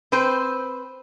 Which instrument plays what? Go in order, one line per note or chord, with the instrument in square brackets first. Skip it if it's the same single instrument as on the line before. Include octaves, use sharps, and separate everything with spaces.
[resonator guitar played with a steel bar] C4 B4 C5